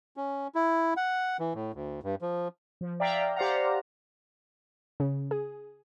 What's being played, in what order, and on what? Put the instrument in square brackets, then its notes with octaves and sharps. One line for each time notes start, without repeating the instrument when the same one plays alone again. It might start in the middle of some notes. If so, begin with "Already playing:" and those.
[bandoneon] C#4
E4
F#5
E3
A2
D2
G2
F3
[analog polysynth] F3
D5 E5 F5 G5 A#5
G4 C5 D5 F5 F#5 A#5
[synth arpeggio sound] C#3
G#4